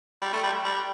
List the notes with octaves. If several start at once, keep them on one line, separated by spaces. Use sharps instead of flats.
G3
A3
G3
G3